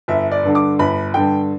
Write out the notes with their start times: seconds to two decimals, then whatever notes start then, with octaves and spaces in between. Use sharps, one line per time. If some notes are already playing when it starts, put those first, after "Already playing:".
0.08 G1 E5
0.31 D5
0.44 G2 D3
0.55 D6
0.79 G1 B5
1.14 G2 D3 G5